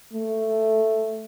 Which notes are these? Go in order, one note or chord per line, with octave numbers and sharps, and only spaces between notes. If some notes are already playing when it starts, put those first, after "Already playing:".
A3